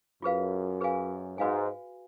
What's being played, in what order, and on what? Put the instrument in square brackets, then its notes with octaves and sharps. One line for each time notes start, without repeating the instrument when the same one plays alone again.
[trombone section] F#2 [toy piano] F4 G#4 B4 F5
[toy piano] G#4 B4 F5 G#5
[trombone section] G#2 [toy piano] F#4 B4 F5 G#5